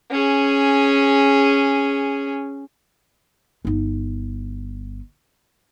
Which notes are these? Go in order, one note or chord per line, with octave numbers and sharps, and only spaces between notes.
C#4 G#4
G1 D#4